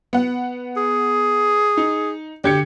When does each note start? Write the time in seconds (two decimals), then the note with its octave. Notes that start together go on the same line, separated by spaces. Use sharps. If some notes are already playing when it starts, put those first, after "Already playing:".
0.13 B3 F#5
0.77 G#4
1.77 D#4
2.44 D3 G4 G#6 C#7